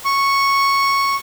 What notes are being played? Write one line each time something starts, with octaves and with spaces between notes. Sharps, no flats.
C#6